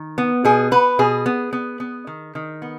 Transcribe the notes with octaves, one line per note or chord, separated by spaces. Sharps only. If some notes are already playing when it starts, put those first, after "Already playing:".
Already playing: D#3
B3
B2 G#4
B3 B4
B2 G#4
B3
B3
B3
D#3
D#3
B3